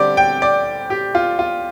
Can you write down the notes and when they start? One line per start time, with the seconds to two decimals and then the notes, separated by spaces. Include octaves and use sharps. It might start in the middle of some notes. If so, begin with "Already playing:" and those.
Already playing: D3 G3 C4 G4 D5
0.17 G5
0.42 D5
0.90 G4
1.15 F4
1.39 F4